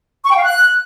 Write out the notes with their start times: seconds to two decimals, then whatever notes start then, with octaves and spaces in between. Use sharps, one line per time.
0.24 C#6
0.31 G5
0.37 F5
0.44 F#6